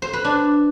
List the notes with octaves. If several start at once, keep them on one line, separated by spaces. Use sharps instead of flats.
C5
B4
D4